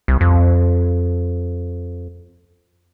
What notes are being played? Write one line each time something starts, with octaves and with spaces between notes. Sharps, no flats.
C2
F2